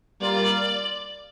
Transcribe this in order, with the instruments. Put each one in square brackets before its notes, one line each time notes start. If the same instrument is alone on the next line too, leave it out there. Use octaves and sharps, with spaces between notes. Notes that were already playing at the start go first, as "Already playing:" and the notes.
[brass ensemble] G3 A#3 F4 [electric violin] D5